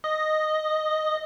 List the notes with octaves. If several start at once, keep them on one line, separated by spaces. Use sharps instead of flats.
D#5